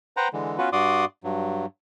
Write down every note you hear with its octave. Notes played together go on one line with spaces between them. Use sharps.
B4 C5 F#5 G5 A#5
D3 E3 G#3
B3 C#4 F4 F#4 B4
G2 F#4 D5 C6 D6 D#6
G2 F#3